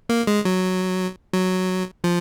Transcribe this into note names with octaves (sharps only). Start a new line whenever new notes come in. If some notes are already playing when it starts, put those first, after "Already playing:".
A#3
G#3
F#3
F#3
F3